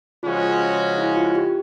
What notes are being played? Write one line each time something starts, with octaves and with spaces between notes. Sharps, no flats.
C#3 F3 G#3 C#4 F4 F#4
E4
F4
G4